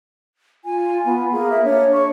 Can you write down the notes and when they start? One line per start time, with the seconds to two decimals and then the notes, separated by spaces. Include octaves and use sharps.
0.65 F4 G#5
1.05 B3
1.33 A#3 G#4
1.50 E5
1.64 D4 C#5
1.94 C#6